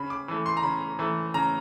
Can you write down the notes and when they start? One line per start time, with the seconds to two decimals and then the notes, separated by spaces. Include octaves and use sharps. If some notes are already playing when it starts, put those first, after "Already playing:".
Already playing: C#3 B5
0.10 D6
0.28 E3 A3
0.46 C6
0.57 A#5
0.63 C#3 B5
0.99 E3 A3
1.34 C#3 A#5